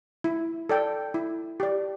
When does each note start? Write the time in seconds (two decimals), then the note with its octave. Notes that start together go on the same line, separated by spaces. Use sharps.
0.24 E4
0.69 A4 D5 G5
1.14 E4
1.60 G4 D5